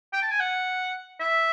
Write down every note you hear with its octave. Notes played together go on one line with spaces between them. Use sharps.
G5
A5
G#5
F#5
E5